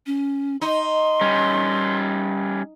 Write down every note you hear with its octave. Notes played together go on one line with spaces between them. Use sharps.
C#4
D#4 C6
G3 C#4